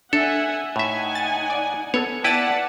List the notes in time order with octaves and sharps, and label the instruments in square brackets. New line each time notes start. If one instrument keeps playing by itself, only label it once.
[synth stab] D4 [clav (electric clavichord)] A4 [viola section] E5 F#5 G#5
[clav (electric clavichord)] A2 E5 [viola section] D#4 F#5 G#5
[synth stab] A6
D5
[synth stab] B3 A4 [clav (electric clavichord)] C#5
[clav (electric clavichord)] E4 B4 [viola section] D5 F#5 A5 [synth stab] G5 A6